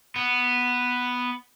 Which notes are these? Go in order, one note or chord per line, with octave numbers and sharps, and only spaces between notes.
B3